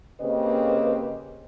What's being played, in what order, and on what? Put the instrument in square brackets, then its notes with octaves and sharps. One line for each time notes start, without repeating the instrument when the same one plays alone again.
[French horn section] C#3 A#3 C4 G4 B4 D#5